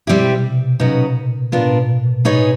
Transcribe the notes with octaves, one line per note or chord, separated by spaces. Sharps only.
B2 G3 C4 E4 G4
C3
C3
B2
A#2 C#3 F#3 B3 D#4
A#2
A2 B3 D4 F4 A#4
B2
A#2
B2
A#2
A2 B3 D#4 G#4 C#5